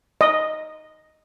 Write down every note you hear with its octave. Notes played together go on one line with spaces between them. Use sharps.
D#5